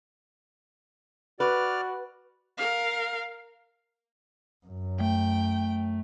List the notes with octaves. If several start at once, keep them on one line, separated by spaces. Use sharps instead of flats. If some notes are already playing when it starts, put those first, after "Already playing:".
F#4 B4 D5 F6
A#4 F5
F#2
A3 G5